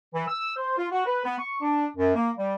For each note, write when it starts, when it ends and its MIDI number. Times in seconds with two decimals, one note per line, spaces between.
0.14 0.23 52
0.28 0.53 88
0.56 0.75 72
0.78 0.86 65
0.92 1.02 66
1.06 1.20 71
1.24 1.38 59
1.38 1.56 85
1.61 1.86 62
1.95 2.13 42
2.14 2.30 58
2.38 2.55 55